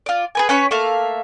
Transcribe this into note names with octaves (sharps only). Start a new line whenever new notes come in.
F4 D5
G#4 B4 G#5
C#4 B4 C#5 B5
A3 A#3 E5 F5